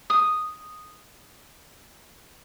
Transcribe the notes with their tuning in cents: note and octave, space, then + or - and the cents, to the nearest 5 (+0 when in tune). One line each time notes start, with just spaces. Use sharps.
D#6 -5